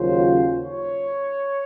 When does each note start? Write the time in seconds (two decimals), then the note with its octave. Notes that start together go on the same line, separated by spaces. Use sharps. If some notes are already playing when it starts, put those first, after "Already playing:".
Already playing: D#2 C#3 F#3 C#4 F4 C5
0.64 C#5